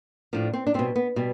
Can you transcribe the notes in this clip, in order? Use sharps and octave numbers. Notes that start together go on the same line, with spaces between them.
A2 F3 D4
C4
D4
B2 G3 C4
B3
B2 G3